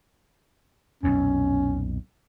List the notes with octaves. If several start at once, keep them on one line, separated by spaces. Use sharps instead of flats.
B1 F2 A#2 C#4